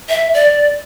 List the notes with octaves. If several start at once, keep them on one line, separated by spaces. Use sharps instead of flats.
E5
D5